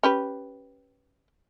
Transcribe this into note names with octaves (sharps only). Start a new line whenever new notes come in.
C#4 G4 B4